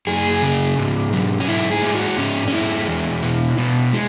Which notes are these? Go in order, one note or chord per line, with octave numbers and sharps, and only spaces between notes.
F#2 G#4
C#3
G#2
F#3
C#4
G#2 E4
G#4
G#3 E4
F#4
G#2 C#4
C#4
G#3 E4
E2
B2
B2
G#3